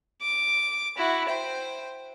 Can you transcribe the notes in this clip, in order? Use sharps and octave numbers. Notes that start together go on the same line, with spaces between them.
D6
E4 F#4
C5 G5